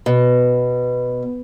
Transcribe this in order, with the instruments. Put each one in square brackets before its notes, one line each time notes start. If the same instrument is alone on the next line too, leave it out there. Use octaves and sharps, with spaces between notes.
[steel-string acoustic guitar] B2